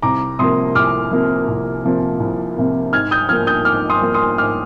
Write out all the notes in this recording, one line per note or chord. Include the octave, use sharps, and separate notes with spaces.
C2 A#5 D6
C3 F3 A#3 C6 D#6
C2 D6 F6
C3 F3 A#3
C2
C3 F3 A#3
C2
C3 F3 A#3
G#2 F6 G#6
D#6 G6
F3 A#3 F6 G#6
D#6 G6
G#2 D6 F6
C6 D#6
F3 A#3
C6 D#6
G#2 D6 F6